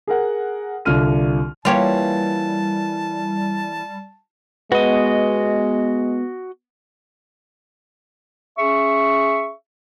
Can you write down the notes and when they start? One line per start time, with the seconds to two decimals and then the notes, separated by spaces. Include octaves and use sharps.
0.07 G#4 A#4 F#5
0.85 C2 D3 F4 F6 D#7
1.65 E3 G3 A#3 C#4 F4 G4 C#5 A5
4.72 G#3 B3 F#4 D#5
8.57 C#4 G#4 E5 C#6